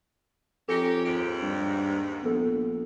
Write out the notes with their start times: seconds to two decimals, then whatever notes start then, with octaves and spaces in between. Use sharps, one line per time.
0.68 F2 C#4 D#4 G4 A4 A#6 C#7
1.05 D#2 G#2 D7
1.41 G2
2.23 A#1 B3 A4